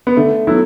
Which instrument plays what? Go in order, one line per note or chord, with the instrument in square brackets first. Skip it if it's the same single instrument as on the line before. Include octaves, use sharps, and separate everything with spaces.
[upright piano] B3
[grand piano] D3 [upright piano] A3
[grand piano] F#3 B3 E4 A4